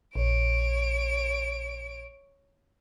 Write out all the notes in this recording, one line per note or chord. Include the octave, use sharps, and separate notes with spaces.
A#1 C#5 D7